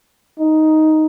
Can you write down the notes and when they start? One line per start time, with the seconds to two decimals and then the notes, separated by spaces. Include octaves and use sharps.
0.39 D#4